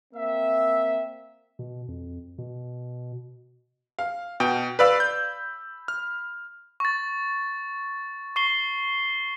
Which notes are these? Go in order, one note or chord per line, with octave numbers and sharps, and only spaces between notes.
A#3 C4 E5
B2
F2
B2
F5
B2 G5
B4 D5 F5 B5 E6
G6
F6
C#6 A6
C#6 C7 G7